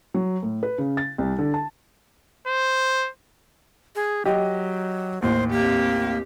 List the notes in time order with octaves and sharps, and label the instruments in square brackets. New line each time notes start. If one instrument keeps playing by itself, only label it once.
[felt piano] F#3
A2
B4
C#3
A6
C2
D3
A5
[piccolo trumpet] C5
[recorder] G#4
[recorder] F#3 [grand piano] G4 D#5
[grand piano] A1 D#2 [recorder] C5
[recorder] A#3 [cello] C4 G4